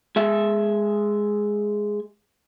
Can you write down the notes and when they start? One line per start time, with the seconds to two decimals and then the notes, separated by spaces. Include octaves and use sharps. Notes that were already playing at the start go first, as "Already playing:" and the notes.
0.16 G#3 E5